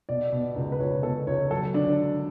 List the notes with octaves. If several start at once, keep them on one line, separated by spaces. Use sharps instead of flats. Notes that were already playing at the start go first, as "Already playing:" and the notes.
B2 D5
B2
C#2
B4
C#2 C#5
B2 A4
C#2 C#5
F#3 A4
D3 D4